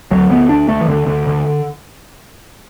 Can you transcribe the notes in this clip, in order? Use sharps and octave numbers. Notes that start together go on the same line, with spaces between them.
D2 F#3
D2 B3
D2 D4
D2 A3
E3
D2 D3
D2 D3
D3